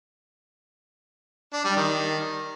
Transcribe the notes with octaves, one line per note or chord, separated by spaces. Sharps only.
D4
G3
D#3